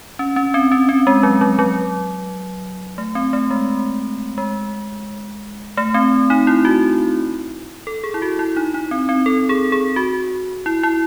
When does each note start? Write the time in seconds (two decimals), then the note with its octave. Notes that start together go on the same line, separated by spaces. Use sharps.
0.19 C#4
0.36 C#4
0.54 C4
0.71 C#4
0.89 C4
1.07 G#3
1.23 F#3
1.41 F#3
1.59 F#3
2.98 A3
3.15 C4
3.33 A3
3.50 G#3
4.38 G#3
5.77 A3
5.94 C4
6.30 D#4
6.47 E4
6.65 F#4
7.87 A4
8.04 G#4
8.14 E4
8.22 F#4
8.39 E4
8.57 D#4
8.74 D#4
8.91 C4
9.09 C4
9.26 A4
9.49 G#4
9.72 G#4
9.96 F#4
10.66 E4
10.83 E4